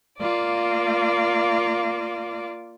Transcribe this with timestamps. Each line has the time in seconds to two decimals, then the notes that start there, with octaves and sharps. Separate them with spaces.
0.18 A#3 F4 D5